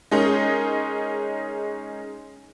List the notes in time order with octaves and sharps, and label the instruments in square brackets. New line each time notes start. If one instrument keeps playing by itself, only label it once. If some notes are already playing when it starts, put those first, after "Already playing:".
[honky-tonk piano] G#3 C#4 D#4 G#4 A#4